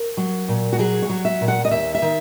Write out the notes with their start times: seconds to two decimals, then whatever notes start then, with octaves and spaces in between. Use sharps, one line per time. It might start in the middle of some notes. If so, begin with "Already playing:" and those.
Already playing: A#4
0.17 F#3
0.48 A#2
0.73 F#4
0.79 F#3 G#4
1.02 C#5
1.09 F#3
1.25 E5
1.41 A#2
1.48 F#5
1.65 D#5
1.71 D#2 E5
1.95 E5
2.02 D#3